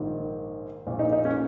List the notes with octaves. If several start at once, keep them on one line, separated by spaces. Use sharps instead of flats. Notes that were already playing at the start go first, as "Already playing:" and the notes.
Already playing: A#1 G#2 D#3
A#1 A#2
D#4
D#4
C#4